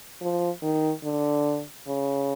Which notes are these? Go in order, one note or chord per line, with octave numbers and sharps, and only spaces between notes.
F3
D#3
D3
C#3